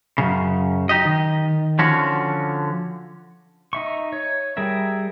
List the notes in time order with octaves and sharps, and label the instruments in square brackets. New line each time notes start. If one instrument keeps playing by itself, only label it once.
[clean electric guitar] F#2 A#2 C#3
D#4 G4 D#5
D#3
D3 F3 C#4 F#4
[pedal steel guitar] D#4 E5 C#6
C#5
G3 G#4 A#4 E5